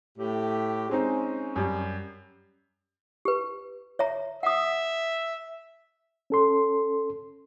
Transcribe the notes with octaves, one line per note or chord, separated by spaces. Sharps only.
A2 G4
G#3 C4 C#4 D#4
F#2 G3
G4 B4
C#5 E5 A#5
E5 F#5 D#6
C#4 A4 C6